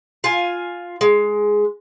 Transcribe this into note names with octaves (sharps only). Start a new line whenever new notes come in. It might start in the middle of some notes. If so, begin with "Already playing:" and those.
F4 G#5
G#3